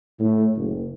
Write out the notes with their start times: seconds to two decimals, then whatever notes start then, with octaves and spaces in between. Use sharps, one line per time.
0.19 A2
0.55 F#1